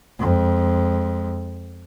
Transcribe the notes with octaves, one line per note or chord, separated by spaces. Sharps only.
F2 G#3